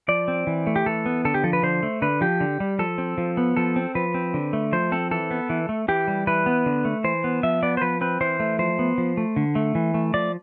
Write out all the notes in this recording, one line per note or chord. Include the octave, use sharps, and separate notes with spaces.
F3 D5
C4
E3
A3
G4
E3 A4
B3
D3 A4
G4
F3 A4
B4
D3 C5
A3
D3 B4
F3 G4
D3
G3
F3 A4
C4
F3
B3
F3 A4
C4
F3 B4
C4
D3
A3
F3 C5
C4 A4
E3 A4
B3
E3
A3
E3 G4
G3
E3 B4
B3
D3
A3
E3 C5
B3
F3 E5
B3 D5
C5
F3 B4
C4 B4
E3 C5
A3
F3 C5
B3
F3
A3
D3
A3
E3
A3
F3 D5